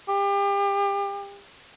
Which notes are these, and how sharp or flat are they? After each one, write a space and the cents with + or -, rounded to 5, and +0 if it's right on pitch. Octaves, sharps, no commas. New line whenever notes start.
G4 +35